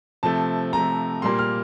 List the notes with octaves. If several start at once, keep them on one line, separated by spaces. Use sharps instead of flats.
C3 F3 A3 A5
C3 F3 A3 A#5
A#2 G3 A#3 C6
F6